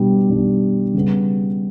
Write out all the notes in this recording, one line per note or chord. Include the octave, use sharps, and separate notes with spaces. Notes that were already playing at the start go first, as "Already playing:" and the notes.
Already playing: B2 G3 D4
B2 G3 D4
C#3 G3 B3